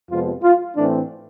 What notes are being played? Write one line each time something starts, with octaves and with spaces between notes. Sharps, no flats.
F2 C3 F3 G#3 B3 F4
F4
A2 E3 A3 C4 D4